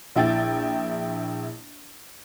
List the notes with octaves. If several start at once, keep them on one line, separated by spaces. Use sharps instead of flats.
A#1 E4 G5 A6